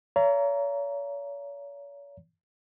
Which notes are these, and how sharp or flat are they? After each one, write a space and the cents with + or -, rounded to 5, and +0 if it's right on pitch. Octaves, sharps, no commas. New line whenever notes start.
C#5 +40 F5 -45 A#5 +0